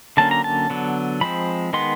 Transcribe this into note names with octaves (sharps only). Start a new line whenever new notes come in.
D3 F#3 A#3 C#4 A5
A#5
A5
D3 F#3 B3
F3 G#3 C4 B5
D#3 G#3 B3 C6